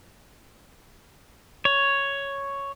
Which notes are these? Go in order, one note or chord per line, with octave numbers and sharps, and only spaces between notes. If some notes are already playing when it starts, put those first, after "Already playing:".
C#5